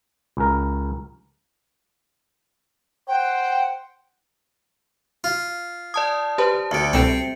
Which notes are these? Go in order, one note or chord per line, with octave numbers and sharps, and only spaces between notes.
C#2 A#4
C5 F#5 G5
F4
D5 A5 D#6 G#6
G4 B4 C5 A5
D2 D3 E5 C#7 D7
C2 B2 A3 C4